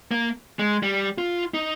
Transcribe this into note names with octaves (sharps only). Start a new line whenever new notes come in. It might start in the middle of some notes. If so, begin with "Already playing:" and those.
A#3
G#3
G3
F4
D#4